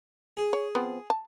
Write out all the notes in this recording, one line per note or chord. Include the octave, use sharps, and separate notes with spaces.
G#4
C#5
F3 B3 C4
A5